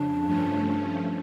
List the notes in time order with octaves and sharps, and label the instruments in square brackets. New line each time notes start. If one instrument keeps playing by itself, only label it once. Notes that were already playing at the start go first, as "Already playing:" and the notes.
Already playing: [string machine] F2 C#3 [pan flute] D4
[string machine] G2 F3 A3 C#4